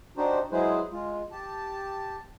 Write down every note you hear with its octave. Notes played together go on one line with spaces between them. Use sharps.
D4 D#4 F#4 G4 C5
F#3 G#3 E4 G#4 B4 C5
G#3 F4
G4 A5